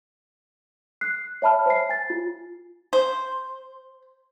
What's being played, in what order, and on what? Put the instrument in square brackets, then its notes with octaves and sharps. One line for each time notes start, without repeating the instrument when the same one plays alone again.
[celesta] F#6 C7
C#5 E5 A5 B5 F6
C5 G#5 C7
G#5 A6
F4
[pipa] C5